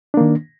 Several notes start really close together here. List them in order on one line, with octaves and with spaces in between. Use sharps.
D4 A#3 D#3